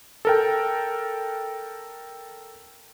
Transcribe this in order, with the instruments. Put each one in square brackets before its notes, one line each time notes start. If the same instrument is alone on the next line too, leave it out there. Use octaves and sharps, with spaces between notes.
[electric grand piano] A4 A#4 G5